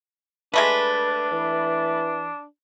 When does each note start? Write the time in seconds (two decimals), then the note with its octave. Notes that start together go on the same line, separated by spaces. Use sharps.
0.54 G#3 A3 D4 B4 D#5
1.32 E3